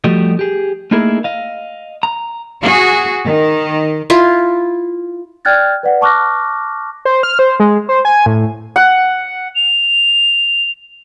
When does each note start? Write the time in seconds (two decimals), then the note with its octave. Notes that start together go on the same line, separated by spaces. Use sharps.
0.04 F3 G3 A3 F#4 G4 D#5
0.39 G4 G#4
0.91 A3 A#3 D#4 E4 G#4 A#4
1.24 D#5 F5
2.03 A#5
2.62 F#4 G#4
3.25 D#3
4.10 E4 F4
5.45 D5 G5 F6 F#6 G#6 A6
5.83 B4 D5 F#5
6.01 A5 C#6 D6 F6 F#6 A#6
7.05 C5
7.23 F6
7.39 C5
7.60 G#3
7.89 C5
8.05 G#5
8.26 A2
8.76 F#5
9.55 F7